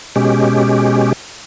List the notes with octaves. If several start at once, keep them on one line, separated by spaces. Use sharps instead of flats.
B2 G#3 C#4 G4